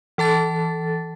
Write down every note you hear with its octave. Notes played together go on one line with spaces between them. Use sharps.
E3 A4 A5 A6